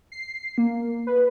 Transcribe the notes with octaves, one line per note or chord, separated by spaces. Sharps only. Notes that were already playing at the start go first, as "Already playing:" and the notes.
C7
A#3
B4